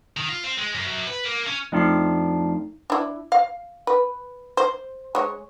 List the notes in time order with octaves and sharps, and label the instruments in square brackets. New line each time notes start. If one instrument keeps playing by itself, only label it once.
[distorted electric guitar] D#3
F4
C4
G#3
F#2
F#2
B4
A#3
C#4
[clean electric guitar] F2 F3 D4 [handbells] A3 D#4 C7
[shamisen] D4 E4
F5
B4
C5
G#3 C#5